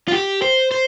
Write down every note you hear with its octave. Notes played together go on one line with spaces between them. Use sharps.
F4
G4
C5
C5